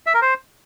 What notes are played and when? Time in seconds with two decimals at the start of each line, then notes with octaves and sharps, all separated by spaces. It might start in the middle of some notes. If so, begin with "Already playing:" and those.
0.06 E5
0.14 A#4
0.22 C5